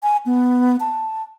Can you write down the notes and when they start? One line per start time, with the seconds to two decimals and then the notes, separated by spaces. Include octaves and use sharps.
0.03 G#5
0.26 B3
0.80 A5